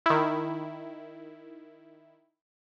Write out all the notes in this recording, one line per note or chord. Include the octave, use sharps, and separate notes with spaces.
D#3 E4